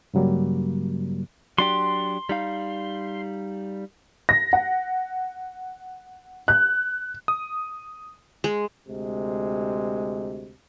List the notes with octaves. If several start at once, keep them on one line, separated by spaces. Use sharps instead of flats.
G2 C#3 F#3 G3 A#3
F#3 D4 G4 C6
G3 D#4 F5
A#6
F#5
F#6
D#6
G#3
D2 C3 G#3